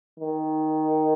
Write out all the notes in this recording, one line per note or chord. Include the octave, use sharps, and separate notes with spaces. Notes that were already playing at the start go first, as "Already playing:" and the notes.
D#3